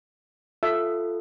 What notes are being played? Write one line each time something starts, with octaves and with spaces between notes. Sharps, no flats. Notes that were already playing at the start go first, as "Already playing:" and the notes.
F4 A4 E5